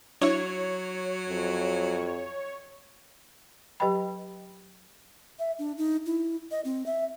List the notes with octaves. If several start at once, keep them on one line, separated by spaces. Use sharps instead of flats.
F#3 D4 E4 C#5
F2
F#3 G4 B4 D#5 G5 B5
E5
D4
D#4
E4
D#5
C4
E5